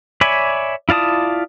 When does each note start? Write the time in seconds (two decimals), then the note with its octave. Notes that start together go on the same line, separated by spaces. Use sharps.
0.21 C#5 D5 E5 G#5 B5
0.89 E4 F4 D5 A5 D#6